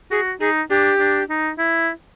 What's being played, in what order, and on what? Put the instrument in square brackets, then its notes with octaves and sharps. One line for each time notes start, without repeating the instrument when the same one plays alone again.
[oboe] F#4 [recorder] G#4
[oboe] D#4 [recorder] G#4
[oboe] D4 [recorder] G4
[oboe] D4
D#4
E4